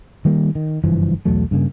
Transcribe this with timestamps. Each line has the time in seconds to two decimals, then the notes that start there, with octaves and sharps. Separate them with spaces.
0.25 D#3 G3 A#3
0.55 D#3
0.84 F#1 G2 E3 F3
1.25 B1 E2 F#3 A3
1.51 G2 C#3 A#3